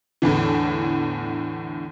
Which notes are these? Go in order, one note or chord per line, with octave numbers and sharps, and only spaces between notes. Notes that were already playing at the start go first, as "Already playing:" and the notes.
E2 A2 D3 E3